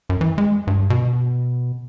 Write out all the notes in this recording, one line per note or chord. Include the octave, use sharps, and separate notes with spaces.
F#2
E3
G#3
G2
B2